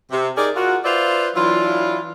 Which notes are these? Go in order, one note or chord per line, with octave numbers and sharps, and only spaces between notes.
C3
D#4 G#4 A#4 D5
F4 F#4 A#4
F4 B4 C5 D5 E5 F5
E3 F#3 D4 E4 F4